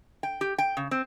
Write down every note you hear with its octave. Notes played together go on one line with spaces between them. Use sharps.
G5
G4
G5
C#3
C4